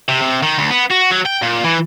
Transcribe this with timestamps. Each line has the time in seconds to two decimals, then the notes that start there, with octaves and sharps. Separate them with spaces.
0.09 C3
0.21 C3
0.43 D#3
0.58 D2
0.70 B3
0.90 F#4
1.11 F#3
1.25 G5
1.42 A#2
1.64 E3